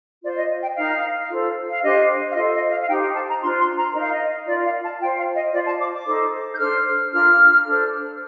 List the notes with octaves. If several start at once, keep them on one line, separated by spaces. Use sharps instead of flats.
F4 C5 D5
D#5
G5
D#4 A#4 F5
F4 A4 C5
F5
D4 G4 C5 D#5
F5
F4 A4 C5 D#5
D#5
F5
F5
D#4 G4 C5 G5
A5
A#5
D4 F4 C5 C6
C6
A#5
D#4 A#4 D#5
F5
D#5
F4 A#4 D5
F5
A5
F4 C5 G5
F5
D#5
F4 C5 D5
A5
D6
D6
D#4 A4 C5
G6
D4 A4 C5 F6
D4 F4 A#4 F6
D4 A4 C5